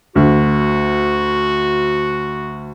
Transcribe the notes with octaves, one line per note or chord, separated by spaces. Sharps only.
D2 F#4